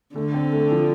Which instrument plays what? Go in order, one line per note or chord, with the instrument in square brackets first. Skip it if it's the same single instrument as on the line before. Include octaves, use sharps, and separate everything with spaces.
[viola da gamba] D3 [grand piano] A3
[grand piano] C4
A3
F3